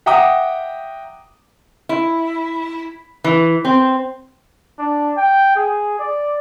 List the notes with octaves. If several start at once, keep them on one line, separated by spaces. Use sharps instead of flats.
E5 F#5 G5 A#5 D6 D#6
E4
E3
C4
D4
G5
G#4
D5